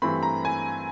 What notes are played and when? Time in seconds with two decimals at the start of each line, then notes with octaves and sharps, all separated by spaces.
0.02 G2 E3 A3 C4 B5
0.23 A#5
0.45 G#5